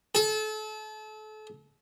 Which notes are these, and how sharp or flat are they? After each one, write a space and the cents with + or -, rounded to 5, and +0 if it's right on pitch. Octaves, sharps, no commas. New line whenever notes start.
A4 -35